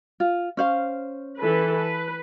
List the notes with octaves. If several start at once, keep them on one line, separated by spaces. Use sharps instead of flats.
F4
C#4 C5 F5
E3 A4 B4
B4